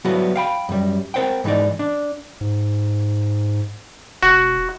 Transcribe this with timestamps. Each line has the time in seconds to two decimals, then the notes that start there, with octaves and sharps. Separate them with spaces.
0.05 F#3 G3 B3 E4 F#4
0.36 F5 G5 B5
0.69 F#2 G3
1.14 C4 A#4 C5 F#5 G5
1.44 G#2 E3 B3 D#4 D5
1.79 D4
2.41 G#2
4.23 E1 F#4